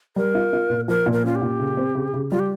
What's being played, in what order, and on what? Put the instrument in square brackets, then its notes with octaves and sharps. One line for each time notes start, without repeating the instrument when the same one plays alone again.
[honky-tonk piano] G3 [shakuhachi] A#4
[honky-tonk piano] F4
F4
A#2
[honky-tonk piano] F3 [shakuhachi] A#4
[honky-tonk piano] A#2
[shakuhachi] A#4
[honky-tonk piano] C#4 [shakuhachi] F4
[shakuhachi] G4
[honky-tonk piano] A#2
C#3
C4
C#3
C#3
[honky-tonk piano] G3 [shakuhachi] F4
[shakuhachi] G4